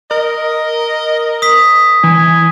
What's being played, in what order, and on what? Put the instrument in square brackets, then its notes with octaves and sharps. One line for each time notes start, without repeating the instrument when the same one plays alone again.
[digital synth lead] A#4 [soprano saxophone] D#5
[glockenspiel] D#6 B6
[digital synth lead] E3 [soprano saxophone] G#5